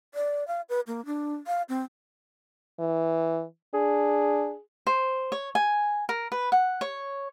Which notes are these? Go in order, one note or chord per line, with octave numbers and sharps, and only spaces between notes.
D5
F5
B4
A#3
D4
F5
C4
E3
D4 G#4
C5
C#5
G#5
A#4
B4
F#5
C#5